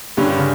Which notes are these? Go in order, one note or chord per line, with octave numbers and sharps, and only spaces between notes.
G2 D3 G3 C#4 G4
G2
C#3